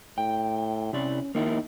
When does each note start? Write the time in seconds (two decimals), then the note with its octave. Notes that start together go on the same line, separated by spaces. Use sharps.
0.18 A2 G5
0.93 C3 C#4 E4 D5
1.35 D#3 A#3 D#4 E4